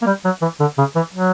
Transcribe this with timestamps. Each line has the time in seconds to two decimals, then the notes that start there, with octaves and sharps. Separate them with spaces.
0.02 A#3
0.07 G3
0.25 F#3
0.42 E3
0.60 D3
0.78 C#3
0.96 E3
1.14 F#3